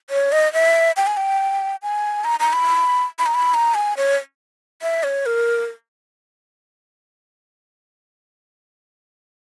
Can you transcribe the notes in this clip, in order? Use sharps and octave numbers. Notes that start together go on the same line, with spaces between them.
C#5
D#5
E5
G5
G#5
G5
G#5
A#5
A#5
B5
B5
A#5
B5
A#5
G#5
C#5
E5
C#5
A#4